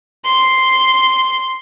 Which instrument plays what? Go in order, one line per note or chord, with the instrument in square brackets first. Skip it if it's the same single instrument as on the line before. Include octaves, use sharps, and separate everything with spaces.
[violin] C6